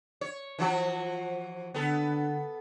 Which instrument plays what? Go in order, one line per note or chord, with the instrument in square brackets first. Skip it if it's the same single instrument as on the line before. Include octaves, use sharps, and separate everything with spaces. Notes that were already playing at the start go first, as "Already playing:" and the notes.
[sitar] C#5
E3 F3 F#4
[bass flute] D3 [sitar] B3 A4